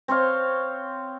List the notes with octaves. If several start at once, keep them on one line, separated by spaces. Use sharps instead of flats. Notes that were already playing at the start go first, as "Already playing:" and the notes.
C4 C5 C#5 F5